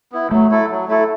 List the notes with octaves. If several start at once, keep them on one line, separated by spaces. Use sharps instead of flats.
B3 E4
F#3 A3
A3 E4 A4
F#3
A3 E4 A4